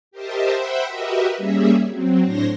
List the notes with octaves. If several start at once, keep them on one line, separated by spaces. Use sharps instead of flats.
G4 A#4 C5 D#5 E5 A5
C5 E5 F#5 G5 B5
F#4 G4 A#4 B4 D#5 E5
G3 A#3 C#4 G#4 E5
F#3 C4
A2 D4 C5 C#5 C6 A#6